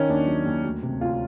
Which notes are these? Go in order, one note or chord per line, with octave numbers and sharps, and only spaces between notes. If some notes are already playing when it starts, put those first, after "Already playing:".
Already playing: D#3 C#4
D#2 D4
F#3
D#2
D2
C3
D2 F4